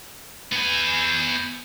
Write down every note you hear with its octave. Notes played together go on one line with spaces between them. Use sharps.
B3 G#5